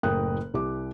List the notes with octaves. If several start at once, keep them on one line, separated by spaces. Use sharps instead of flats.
F#1 A2 A#4 G5 D#6 F#6
C2 G4 D6